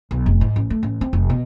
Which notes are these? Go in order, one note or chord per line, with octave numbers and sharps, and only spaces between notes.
B1
F1
G#2
A1
A3
A1
C4
F1
B2